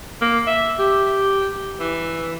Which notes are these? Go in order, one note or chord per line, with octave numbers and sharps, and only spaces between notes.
A#3
E5
G4
E3